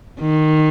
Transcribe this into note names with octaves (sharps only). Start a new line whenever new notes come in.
D#3